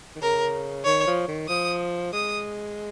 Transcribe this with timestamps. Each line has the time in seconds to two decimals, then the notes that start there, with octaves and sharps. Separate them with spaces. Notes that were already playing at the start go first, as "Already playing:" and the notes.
0.16 D#3
0.21 C#3 A#4
0.85 D#3 C#5
1.07 F3
1.28 D#3
1.48 F3 D#6
2.13 G#3 D#6